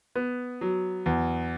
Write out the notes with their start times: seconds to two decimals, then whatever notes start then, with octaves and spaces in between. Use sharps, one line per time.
0.15 B3
0.61 F#3
1.06 E2